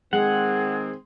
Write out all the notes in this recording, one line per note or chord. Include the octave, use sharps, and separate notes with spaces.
D#3 G#3 C4 G#4 F#5